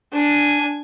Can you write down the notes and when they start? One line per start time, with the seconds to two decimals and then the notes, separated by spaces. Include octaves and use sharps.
0.13 D4 G#5